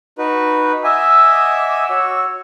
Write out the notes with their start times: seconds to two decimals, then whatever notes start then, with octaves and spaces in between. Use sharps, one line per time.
0.18 D#4 F#4 B4
0.84 D#5 E5 F#5 G#5 D6 E6
1.90 F#4 C#5